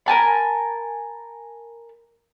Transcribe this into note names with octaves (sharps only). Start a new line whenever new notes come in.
A#4 G#5 A5 B5